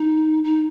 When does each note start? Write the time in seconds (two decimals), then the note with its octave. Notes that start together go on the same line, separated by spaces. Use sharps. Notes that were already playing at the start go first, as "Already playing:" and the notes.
Already playing: D#4
0.44 D#4